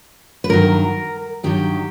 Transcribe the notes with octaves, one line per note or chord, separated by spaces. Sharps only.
B4
G2 D#3 F#3 A#4
G2 D#3 F#3 G4